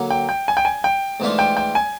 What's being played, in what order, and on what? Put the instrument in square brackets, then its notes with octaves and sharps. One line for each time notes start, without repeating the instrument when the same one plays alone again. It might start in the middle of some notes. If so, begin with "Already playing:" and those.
Already playing: [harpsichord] D3 F#3 A#3
[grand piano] G5
G5
G#5
G5
G#5
G5
[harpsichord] G#2 E3 A3 D4 F4
[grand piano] G5
G5
G#5